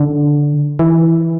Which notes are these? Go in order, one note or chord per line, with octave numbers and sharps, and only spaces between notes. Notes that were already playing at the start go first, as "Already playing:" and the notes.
Already playing: D3
E3